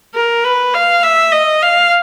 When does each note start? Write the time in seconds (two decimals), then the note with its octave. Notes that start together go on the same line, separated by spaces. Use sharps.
0.14 A#4
0.44 B4
0.74 F5
1.03 E5
1.32 D#5
1.62 F5